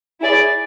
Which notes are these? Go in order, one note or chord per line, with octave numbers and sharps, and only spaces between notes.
E4 G#4 D5